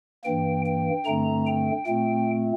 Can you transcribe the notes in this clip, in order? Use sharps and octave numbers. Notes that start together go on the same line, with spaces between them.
G2 E3 A#3 G5
G5
G2 D3 A3 C4 A#5
G5
A#2 A3 C4 G5